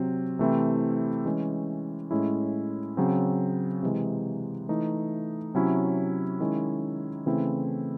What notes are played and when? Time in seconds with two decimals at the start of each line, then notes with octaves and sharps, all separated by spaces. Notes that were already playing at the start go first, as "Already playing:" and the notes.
Already playing: C3 F#3 C4
0.39 C3 E3 A3 C4 E4
1.25 E3 G#3 C#4
2.11 A2 G#3 C#4 E4
2.97 C#3 F#3 C4
3.83 C3 E3 G#3
4.69 E3 A3 D#4
5.54 C3 F#3 C#4 E4
6.40 D#3 G#3 C#4 E4
7.26 C#3 E3 A3 C4 E4